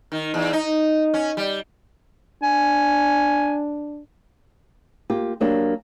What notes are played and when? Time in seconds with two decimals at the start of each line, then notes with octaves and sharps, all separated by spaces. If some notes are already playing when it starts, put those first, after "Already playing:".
0.12 D#3
0.34 E2
0.53 D#4
1.14 C#4
1.37 G3
2.43 D4 G#5
5.10 A#3 F4 G4
5.40 F#3 A#3 D4 G4 A#4